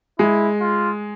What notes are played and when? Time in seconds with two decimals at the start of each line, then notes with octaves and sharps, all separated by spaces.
0.19 G#3 E4
0.61 F4